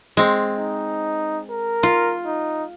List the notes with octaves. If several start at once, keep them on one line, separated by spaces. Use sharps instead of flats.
G#3 C4
D#4
A#4
F4
D#4